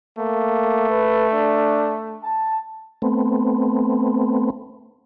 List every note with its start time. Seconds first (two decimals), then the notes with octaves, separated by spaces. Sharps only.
0.18 A3 A#3
0.90 B4
1.34 D4
2.23 A5
3.02 A3 B3 C4